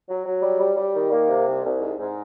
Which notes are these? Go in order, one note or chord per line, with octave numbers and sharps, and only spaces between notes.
F#3
F#3
G3
G3
G3
D#3
A#3
C3
C2
C2
G#2
G#2